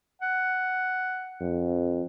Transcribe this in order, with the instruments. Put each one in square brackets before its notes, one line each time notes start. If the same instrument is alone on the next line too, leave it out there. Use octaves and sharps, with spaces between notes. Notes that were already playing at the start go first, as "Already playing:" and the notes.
[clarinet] F#5
[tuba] F2